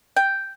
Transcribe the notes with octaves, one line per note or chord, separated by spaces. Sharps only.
G5